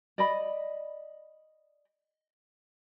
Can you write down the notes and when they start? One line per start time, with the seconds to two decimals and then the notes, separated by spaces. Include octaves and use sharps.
0.18 D5 D#5 B5